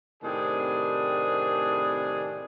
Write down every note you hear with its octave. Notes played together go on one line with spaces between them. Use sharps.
A2 C3 D#3 C4 D4 G#4